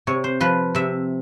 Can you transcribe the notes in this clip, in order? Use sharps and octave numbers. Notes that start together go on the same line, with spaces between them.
C3 C#5
C5
F3 B4
C3 E5